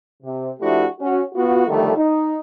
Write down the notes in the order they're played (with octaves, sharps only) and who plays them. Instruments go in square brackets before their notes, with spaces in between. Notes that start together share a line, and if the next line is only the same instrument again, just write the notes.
[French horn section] C3
F3 A3 D4 E4 F#4 G4
C#4 F#4
B3 F4 F#4
D3 D#3 F3 G3 A3
D#4